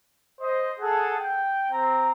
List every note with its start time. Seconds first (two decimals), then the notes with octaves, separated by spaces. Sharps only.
0.40 C5 D#5
0.80 G#4 A4 F#5 A5
1.18 G5
1.70 C4 A#5